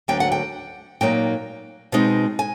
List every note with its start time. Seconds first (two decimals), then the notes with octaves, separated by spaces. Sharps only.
0.08 D2 D3 F#3 A#3 G5
0.20 F#5
0.32 G5
1.01 A#2 F#3 A#3 D#4 G5
1.92 B2 G#3 C4 D#4
2.39 G#5